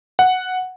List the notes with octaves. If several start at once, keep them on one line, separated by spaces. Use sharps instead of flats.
F#5